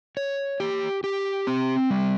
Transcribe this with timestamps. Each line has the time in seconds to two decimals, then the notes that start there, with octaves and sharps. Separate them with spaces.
0.17 C#5
0.60 G4
1.04 G4
1.47 C4
1.90 G3